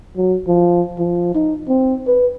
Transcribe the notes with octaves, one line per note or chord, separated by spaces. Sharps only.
F#3
F3
F3
D#4
C4
B4